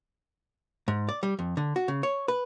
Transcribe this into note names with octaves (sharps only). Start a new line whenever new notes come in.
G#2
D5
G3
F2
D3
F#4
C#3
C#5
B4